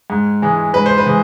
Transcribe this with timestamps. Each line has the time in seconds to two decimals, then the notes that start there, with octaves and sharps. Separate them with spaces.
0.10 G#2
0.42 E3 G#3
0.74 G#2 B4
0.86 C5
0.98 B4
1.06 E3 G#3